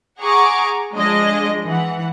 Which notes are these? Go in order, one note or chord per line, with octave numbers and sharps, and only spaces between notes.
G#4 F#5 A#5 C#6 D6
F3 G#3 D4 D#5
E3 F#5